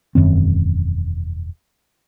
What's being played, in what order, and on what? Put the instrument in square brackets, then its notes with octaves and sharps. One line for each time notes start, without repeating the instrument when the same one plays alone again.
[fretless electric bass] E1 F#2 D#3 C4